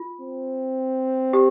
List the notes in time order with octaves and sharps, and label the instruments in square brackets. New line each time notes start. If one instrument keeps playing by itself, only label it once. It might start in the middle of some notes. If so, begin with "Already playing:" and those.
Already playing: [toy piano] F4
[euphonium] C4
[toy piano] G4